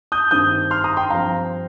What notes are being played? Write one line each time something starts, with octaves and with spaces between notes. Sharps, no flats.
D#6 G6
G2 D#3 C4 D#6 G6
C6 F6
A#5 D#6
G5 C6
G2 F3 C4 F5 A#5